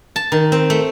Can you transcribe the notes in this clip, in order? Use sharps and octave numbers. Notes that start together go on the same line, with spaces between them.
A5
D#3
C4
A3